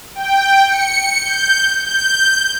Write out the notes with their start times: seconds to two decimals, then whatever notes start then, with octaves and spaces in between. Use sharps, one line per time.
0.15 G5
0.68 C#7
1.21 G6
1.84 G6